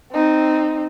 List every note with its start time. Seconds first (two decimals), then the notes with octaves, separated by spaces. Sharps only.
0.12 C4 D#4